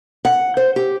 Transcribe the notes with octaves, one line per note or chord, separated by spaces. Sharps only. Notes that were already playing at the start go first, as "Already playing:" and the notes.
F#5
C5
G4